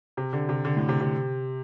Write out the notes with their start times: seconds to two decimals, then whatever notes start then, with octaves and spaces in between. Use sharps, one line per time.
0.17 C3
0.33 D3
0.49 C3
0.65 D3
0.77 A2
0.89 C3
1.00 C3